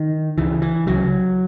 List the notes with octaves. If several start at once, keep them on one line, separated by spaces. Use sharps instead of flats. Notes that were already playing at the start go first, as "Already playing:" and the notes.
Already playing: D#3
C#2 C#3 E3
E3
C#2 C#3 F#3